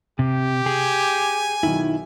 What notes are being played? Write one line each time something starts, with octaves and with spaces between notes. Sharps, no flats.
C3 G4
G#4 G#5
B1 D#3 E4